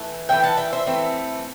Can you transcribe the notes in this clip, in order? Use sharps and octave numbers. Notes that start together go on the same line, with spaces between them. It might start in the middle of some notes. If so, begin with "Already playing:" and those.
Already playing: E3 A3
E3 A3 C4 E5 G5
F#5 A5
E5 G5
C5 E5
E3 A3 C4